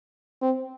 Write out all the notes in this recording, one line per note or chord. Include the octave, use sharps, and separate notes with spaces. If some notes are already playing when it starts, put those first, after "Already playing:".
C4